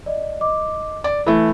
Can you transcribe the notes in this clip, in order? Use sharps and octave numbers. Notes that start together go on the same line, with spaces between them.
D5 D#5
D#5 D6
D5
E3 A3 B5